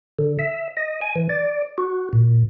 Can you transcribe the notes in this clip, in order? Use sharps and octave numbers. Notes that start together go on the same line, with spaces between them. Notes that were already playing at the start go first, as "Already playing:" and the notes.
D3
E5
D#5
G#5
E3
D5
F#4
A#2